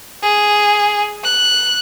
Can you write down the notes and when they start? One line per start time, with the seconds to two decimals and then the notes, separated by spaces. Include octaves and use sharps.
0.23 G#4
1.24 F#6